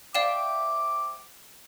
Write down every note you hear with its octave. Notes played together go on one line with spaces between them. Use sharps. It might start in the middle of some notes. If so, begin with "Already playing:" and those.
C5 D5 E5 F5 G5 D6 E7